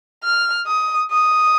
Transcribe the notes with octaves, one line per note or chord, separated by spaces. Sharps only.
F6
D#6
D#6